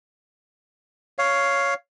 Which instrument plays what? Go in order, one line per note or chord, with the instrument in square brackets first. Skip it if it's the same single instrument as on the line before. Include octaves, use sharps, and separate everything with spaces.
[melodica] C#5 F5